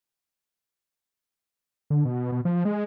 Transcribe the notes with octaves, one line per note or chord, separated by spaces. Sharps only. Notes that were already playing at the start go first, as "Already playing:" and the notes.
D3
B2
B2
F3
G#3